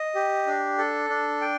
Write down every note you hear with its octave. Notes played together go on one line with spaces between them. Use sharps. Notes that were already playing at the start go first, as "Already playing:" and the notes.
Already playing: D#5
G4
D4
A4
D4
G5